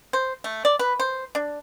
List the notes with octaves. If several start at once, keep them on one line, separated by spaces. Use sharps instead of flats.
C5
A3
D5
B4
C5
D4